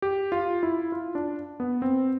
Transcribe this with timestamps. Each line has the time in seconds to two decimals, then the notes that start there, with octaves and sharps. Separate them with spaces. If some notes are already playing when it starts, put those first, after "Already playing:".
0.02 G4
0.32 F4
0.63 E4
0.92 F4
1.15 D4
1.60 B3
1.82 C4